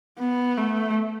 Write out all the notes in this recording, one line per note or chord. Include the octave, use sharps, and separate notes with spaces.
B3
A3